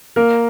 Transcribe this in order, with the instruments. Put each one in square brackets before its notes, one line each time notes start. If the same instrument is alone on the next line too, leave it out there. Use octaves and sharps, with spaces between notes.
[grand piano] A#3 A#4